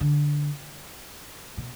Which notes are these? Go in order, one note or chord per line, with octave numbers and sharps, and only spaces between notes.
D3
B2